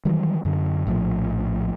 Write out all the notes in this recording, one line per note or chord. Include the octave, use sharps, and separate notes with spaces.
D#3 E3 F#3 G3
F#2 D3
A#1 A2 E3 F3